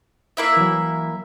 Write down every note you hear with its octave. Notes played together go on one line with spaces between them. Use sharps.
A#3 E4 E5
E3 F#3